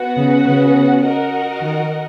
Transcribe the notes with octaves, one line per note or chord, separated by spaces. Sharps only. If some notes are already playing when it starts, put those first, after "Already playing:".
Already playing: B3 F#4 B4 F#5
C#3
C#3
F#4 A#4 D#5 F#5
D#3